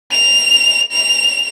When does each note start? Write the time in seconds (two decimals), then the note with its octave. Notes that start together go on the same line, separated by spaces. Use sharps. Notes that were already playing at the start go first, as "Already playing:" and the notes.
0.12 F7
0.92 F7